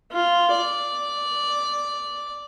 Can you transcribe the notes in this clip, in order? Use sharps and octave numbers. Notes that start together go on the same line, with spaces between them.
F4
D5